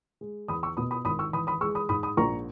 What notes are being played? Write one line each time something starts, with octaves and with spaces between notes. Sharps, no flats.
G#3
E2 B5 D#6
C#6 E6
B2 B5 D#6
B5 D#6
G#1 B5 D#6
C#6 E6
E3 B5 D#6
B5 D#6
G#3 C#6 E6
B5 D#6
G#2 B5 D#6
B5 D#6
A#1 A#5 C#6